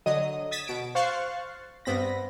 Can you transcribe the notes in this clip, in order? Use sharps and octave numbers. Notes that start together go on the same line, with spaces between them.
D3 F#3 D#5 D#6
D#6 G#6 A6 B6 E7
B2 D7
C5 F5 C#6 F#6 A6 C7
G2 B3 C4 B5 A#6